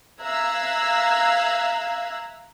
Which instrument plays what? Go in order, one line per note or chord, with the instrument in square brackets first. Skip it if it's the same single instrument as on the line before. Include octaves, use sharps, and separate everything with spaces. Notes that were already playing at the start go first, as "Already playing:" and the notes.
[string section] E5 F5 A#5 E6 F#6 G#6